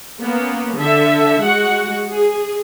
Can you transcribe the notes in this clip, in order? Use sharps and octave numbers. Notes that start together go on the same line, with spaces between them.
A#3 B3 C#4
D3 A4 E5
G#3 F#4 F#5
G#4